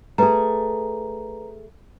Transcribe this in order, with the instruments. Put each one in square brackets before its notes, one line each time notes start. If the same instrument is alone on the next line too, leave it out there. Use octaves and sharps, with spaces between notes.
[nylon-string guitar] A3 G#4 [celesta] B4 A#5